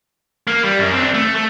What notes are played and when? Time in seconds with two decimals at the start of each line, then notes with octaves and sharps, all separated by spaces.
0.47 A#3
0.64 G3
0.79 F#2
0.93 C4 D4
1.14 A3
1.35 A3